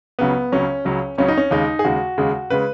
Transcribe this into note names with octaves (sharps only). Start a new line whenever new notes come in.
C#2 C#3 F#3 B3
C#2 C#3 F#3 C#4
C#2 C#3 F#3
C#2 C#3 F#3 C#4
D#4
C#4
D#2 C#3 G#3 D#4
G#4
D#2 C#3 G#3 F#4
D#2 C#3 G#3
C#3 G#3 B4